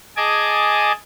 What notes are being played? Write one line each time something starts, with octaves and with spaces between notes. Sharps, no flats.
G#4 D#5 G#5 A5 D6